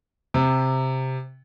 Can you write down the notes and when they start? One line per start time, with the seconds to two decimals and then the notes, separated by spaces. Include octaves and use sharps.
0.34 C3